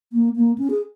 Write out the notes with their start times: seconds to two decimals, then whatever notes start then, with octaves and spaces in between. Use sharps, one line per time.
0.13 A#3
0.36 A#3
0.58 C#4
0.70 G#4